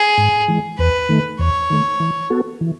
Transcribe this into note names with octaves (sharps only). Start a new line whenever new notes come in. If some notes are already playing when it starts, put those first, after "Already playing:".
Already playing: G#4
G#2
E3 G#3
E2 B4
D#3 A3
E2 C#5
D#3 A3
E3
B3 F#4 A4
E3